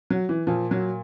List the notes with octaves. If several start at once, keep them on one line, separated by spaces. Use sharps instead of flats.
F#3
E3
A#2 F3
F#3